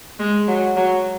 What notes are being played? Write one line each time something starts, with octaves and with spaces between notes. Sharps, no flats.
G#3
F#3
F#3